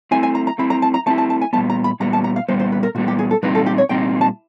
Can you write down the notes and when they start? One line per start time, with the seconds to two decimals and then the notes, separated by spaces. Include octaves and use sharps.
0.11 A3 C4 E4 G#5
0.23 G#5
0.35 A#5
0.47 A#5
0.58 A3 C4 E4 B5
0.70 A#5
0.82 A5
0.94 A#5
1.06 A3 C4 E4 A5
1.18 A5
1.30 A5
1.41 G#5
1.53 A#2 G3 B3 A5
1.70 A#5
1.84 B5
2.00 A#2 G3 B3 A#5
2.13 A5
2.24 A#5
2.36 F5
2.48 A#2 G3 B3 C5
2.60 C5
2.72 B4
2.83 A#4
2.95 A#2 G3 B3 F#4
3.08 G4
3.19 G#4
3.31 A4
3.43 A#2 G3 C4 D#4 B4
3.55 A4
3.66 G4
3.78 C#5
3.89 A#2 G3 C4 D#4 G5
4.21 A5